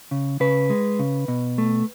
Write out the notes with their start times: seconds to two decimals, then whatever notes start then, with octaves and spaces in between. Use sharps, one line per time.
0.11 C#3
0.40 C#3 B4
0.70 G#3
0.99 C#3
1.28 B2
1.58 A3